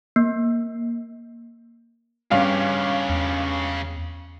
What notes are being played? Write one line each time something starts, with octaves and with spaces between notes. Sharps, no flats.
A#3
G2 C#3 C#4 G4 F5
E2